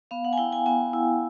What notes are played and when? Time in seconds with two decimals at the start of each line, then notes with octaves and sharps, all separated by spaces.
0.11 B3 F5
0.25 F#5
0.33 G#5
0.38 E4 G5
0.52 G#5
0.66 B3 G#5
0.93 E4